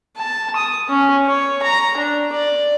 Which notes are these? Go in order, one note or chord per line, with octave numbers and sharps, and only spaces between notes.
A5
D#6
C#4
C#5
A#5
D4
D5